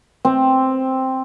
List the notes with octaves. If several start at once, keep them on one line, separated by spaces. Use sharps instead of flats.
C4